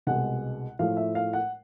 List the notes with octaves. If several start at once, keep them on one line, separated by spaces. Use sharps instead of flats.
C2 B2 G#3 F#5
A2 F3 A3 F5
E5
F5
F#5